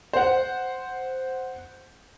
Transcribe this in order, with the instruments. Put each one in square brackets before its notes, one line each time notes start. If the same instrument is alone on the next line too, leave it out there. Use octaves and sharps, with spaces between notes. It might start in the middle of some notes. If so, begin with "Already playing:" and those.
[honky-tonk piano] C5 F#5